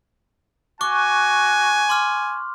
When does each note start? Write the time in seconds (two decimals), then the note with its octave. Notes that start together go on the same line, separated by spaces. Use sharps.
0.81 F#4 G#5 C#6 D6 F#6
1.89 C6 D6 F6